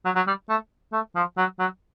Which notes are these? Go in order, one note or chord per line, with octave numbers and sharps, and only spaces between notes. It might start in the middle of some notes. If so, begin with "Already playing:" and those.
F#3
F#3
G3
A3
A3
F3
F#3
F#3